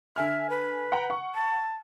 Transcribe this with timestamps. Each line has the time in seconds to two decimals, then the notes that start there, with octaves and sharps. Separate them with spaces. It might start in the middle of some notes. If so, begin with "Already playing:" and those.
0.16 D3 E5 G#5 F6
0.49 B4
0.92 F#5 G5 A#5
1.10 F#5 C#6
1.35 A5